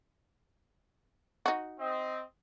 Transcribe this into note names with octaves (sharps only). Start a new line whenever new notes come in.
D#4 F#4
C4 D#5